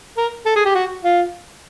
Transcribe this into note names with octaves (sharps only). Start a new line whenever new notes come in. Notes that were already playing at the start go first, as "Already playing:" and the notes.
A#4
A4
G#4
G4
F#4
F4